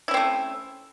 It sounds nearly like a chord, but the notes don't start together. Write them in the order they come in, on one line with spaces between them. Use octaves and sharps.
E4 C#4 C4 A3